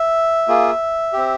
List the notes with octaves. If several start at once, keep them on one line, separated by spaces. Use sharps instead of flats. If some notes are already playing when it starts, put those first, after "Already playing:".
Already playing: E5
A#3 F4 G#4
C4 G4